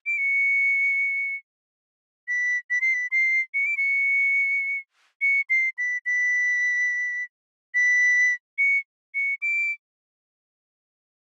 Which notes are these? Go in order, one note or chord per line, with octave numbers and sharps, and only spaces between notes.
D7
C#7
B6
B6
C7
B6
C7
C#7
D7
C#7
C#7
C7
B6
B6
B6
C#7
C#7
D7